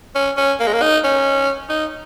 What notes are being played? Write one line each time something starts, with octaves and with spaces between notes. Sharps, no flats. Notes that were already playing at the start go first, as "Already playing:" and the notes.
C#4
C#4
A#3
G#3
A#3
D#4
C#4
D#4